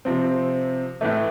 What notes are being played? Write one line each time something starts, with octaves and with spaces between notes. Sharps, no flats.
C3 F3 C4
A2 E3 A3